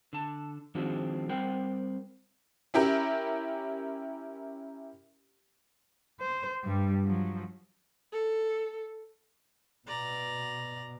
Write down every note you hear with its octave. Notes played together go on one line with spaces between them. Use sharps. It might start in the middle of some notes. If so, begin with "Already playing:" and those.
D3 A5
D#3 F3 G#3 C4 D4 F#4
G3 C4 A#4 C5 F#5 G5
C#4 E4 G4 A#4
C5
G2 G3
F3 F#3
A4
B2 D5 A#5